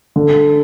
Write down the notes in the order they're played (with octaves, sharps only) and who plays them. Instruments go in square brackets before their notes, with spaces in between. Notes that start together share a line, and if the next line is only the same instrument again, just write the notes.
[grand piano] D3